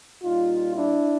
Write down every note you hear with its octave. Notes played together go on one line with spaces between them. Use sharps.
A#2 G3 D#4 F4
D4 E4